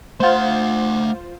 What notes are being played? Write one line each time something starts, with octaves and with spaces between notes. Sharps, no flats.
A3 F4 C5 F#5